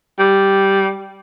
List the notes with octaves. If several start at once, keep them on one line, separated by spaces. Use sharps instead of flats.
G3